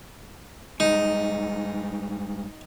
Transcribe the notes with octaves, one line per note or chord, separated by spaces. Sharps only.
G2 G#3 D#4